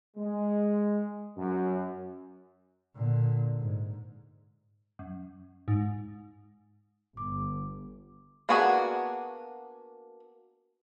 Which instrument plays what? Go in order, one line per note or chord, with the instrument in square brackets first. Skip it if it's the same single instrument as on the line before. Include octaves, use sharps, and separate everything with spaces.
[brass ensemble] G#3
F#2
[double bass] A#2 D3
G#2
[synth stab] F#2
G#2
[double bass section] G1 [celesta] D6
[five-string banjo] A#3 B3 D4 F#4 G#4